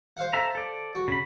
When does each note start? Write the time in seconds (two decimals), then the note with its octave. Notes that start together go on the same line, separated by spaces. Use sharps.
0.17 C5 F5 F#5
0.33 A4 E5 A#5
0.55 A4 D5
0.95 F#4
1.08 C#3 B5